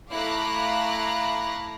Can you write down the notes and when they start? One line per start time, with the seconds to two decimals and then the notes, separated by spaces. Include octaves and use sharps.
0.10 A3 E4 F5 A#5 D6 F#6